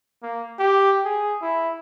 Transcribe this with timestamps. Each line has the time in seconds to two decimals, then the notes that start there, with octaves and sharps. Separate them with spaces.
0.23 A#3
0.59 G4
1.05 G#4
1.42 E4